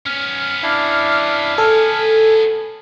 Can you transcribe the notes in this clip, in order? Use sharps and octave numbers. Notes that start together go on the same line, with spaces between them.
B3 C#4 F6
D4 E4 F5
A4 G#5